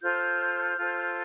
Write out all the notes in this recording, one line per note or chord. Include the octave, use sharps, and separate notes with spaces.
F4 A4 C5 F6 G6
F4 A4 C5